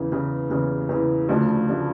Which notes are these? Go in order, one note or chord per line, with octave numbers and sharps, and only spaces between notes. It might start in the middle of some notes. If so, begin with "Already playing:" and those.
Already playing: E2 C#3 E3
E2 C#3 E3
E2 C#3 E3
E2 C#3 E3
D2 C#3 F3 A3 D4
C#3 F3 A3 D4